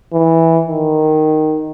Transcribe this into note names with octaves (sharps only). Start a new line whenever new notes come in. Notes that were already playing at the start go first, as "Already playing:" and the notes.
E3
D#3